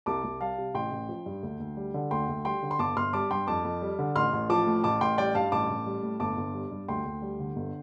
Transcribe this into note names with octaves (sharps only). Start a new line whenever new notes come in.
C2 A5 D6
C2
G3 F5 A5
C3
A1 G5 C6
A1
F3
G2
D2
D2
G3
D3
D2 G5 C6
D2
G3 G5 C6
D3
C6
G1 A5 D6
G1 C6 F6
G3 A5 D6
G2 G5 C6
F2 A5 D6
F2
G3
D3
A1 C6 F6
A1
F3 A5 D6
A2
A1 A5 D6
A1 G5 C6
G3 D5 G5
G2 F5 A5
A1 A5 D6
A1
G3
A2
G1 A5 D6
G1
G3
G2
D2 G5 C6
D2
G3
D3
G1